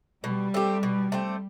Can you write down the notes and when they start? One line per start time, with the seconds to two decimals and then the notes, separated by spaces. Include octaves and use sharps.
0.24 B2 G3
0.54 A3 C4 G4
0.83 B2
1.12 A3 C4 G4